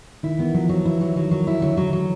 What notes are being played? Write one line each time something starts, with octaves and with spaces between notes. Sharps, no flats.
D#3 E4
E3 B3
F3 F#3
E3 F#3
E4
F#3
D#3 F#3
F#3
E4
D3 F#3
F#3
F#3